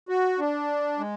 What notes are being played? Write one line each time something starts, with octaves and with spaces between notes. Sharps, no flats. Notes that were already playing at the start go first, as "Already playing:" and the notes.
F#4
D4
G#3